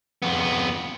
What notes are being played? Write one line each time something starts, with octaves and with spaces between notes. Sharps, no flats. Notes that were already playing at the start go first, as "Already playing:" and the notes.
F2 B3